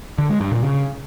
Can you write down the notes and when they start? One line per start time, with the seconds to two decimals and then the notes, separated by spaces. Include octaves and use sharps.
0.18 D3
0.29 G#3
0.41 G2
0.52 A#2
0.63 C#3